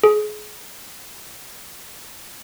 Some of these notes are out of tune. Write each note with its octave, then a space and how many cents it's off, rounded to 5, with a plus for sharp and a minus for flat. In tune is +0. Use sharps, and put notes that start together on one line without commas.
G#4 +30